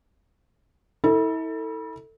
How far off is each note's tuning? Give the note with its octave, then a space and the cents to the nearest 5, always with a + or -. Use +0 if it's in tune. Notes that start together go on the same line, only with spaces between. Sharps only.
E4 -35 A4 +25